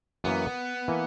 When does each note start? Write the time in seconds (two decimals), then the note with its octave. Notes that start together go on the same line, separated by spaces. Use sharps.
0.24 F#2 E3 A#3 B3
0.88 E3 A#3